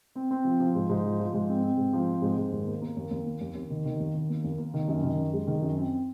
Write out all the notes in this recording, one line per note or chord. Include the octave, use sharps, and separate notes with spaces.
C4
C4
F3
F3
G#2
G#2
F3
F3
G#2
C4
C4
G#2
F3
C4
G#2
G#2
D#2
A#3
A#3
D#2
D#2
A#3
D#2
D#2
D#3
D#3
D#2
D#3
A#3
D#2
A#3
D#3
F#2
D#3
F#2
G#3
D#3
F#2
C4